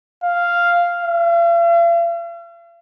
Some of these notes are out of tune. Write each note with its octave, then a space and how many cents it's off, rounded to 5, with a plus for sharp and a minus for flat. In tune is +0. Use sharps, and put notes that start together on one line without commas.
F5 -5
F5 -45